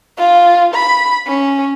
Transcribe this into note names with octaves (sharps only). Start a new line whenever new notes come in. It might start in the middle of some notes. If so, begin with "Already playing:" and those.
F4
B5
C#4